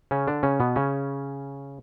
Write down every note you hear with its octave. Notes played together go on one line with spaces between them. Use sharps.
C#3 C#4
D3 D4
C#3 C#4
B2 B3
C#3 C#4